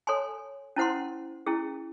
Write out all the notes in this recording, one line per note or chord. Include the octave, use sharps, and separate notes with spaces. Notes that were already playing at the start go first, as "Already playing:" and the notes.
A4 C#5 G#5 C6
C#4 E4 C5 F#5 C6
C#4 E4 G#4